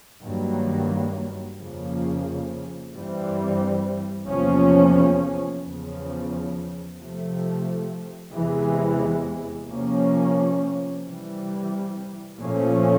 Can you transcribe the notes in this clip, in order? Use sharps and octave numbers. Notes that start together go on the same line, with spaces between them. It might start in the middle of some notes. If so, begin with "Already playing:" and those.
G2 D#3 F#3 A#3
F2 C#3 F3 A#3
G2 E3 G3 C4
E2 C3 F3 A#3 C#4
E2 C#3 F3
C3 F3 A3
E2 C3 E3 G#3
C3 F3 A#3 C#4
C3 E3 G3
A#2 F3 A3 C#4